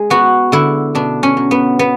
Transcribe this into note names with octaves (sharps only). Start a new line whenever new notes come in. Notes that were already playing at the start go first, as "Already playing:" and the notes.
Already playing: G#3 G#4
B3 F#4
D3 E4
B2 D4
C#4
F#3
B3
B3